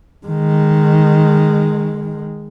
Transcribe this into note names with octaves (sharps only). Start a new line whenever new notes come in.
D#3 G#3